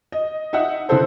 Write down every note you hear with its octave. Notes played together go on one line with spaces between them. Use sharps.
D#5
D#4 E5 F#5
D3 E3 C4 E4 A4 C5